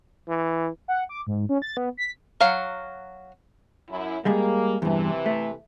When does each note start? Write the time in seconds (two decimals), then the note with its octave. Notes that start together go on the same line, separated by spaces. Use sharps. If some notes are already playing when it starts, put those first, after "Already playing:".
0.28 E3
0.88 F#5
1.09 D6
1.27 G#2
1.49 C#4
1.62 A6
1.77 B3
1.97 B6
2.40 F#3 F5 F#5
3.89 F#2 E4
4.25 G3 G#3 A#3 G#4
4.82 E2 G2 C3 E3
5.26 A3